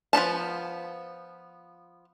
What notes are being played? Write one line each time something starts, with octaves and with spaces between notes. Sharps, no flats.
F3 B3 D#4 A5